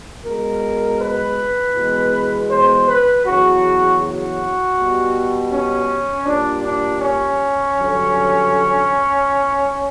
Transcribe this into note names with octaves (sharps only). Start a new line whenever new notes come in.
B2 G#3 A#4
B4
E2 B2 G#3
C5
B4
E2 C#3 F#3 F#4
F#4
B2 G3
C#4
A#2 G3 D4
D4
C#4
G2 D3 F#3